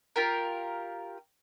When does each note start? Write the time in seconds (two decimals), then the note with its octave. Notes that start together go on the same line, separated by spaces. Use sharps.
0.16 F4 G4 A#4